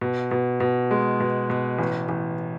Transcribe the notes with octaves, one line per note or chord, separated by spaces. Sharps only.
B2
B2
B2
G#3
B2
B2
A1
A1